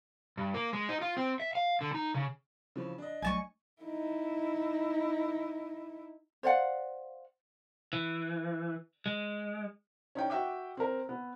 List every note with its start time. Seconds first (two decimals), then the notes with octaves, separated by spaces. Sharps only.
0.37 G2
0.54 A#3
0.73 G#3
0.89 D#4
1.01 F4
1.17 C4
1.40 E5
1.55 F5
1.81 D3
1.95 D#4
2.14 C#3
2.76 C#3 E3 F3
2.98 D4 D#5
3.22 F#3 A3 G#5 A5 C#6
3.83 D#4 E4
6.43 C5 D5 F5 F#5
7.93 E3
9.06 G#3
10.15 C#4 D#4 G5
10.30 F#4 E5 G5 D6
10.77 C4 A#4
11.09 B3